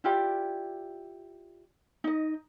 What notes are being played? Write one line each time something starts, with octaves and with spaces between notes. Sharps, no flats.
E4 F4 G4 D5
D#4 D#5